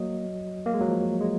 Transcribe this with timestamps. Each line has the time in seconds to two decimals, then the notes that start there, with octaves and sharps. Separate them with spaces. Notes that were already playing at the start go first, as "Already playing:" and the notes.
Already playing: F#3 A#3 D#5
0.66 A#3
0.74 G#3
0.81 F#3
0.88 F3
1.21 G#3